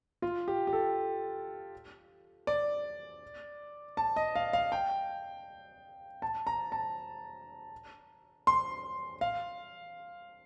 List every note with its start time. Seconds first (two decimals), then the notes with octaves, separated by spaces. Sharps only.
0.22 F4
0.48 G4
0.67 G4
0.73 A4
2.47 D5
3.97 A5
4.16 D#5
4.36 F5
4.53 F5
4.72 G5
6.22 A5
6.47 A#5
6.72 A5
8.47 C6
9.21 F5